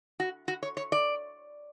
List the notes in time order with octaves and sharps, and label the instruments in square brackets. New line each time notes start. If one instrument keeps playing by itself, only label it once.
[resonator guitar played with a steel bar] F#4
F#4
C#5
C#5
D5